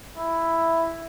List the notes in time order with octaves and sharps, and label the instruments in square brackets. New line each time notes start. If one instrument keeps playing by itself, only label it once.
[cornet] E4